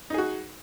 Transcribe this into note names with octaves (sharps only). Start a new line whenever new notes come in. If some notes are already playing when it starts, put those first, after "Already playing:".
D#4 F#4 G#4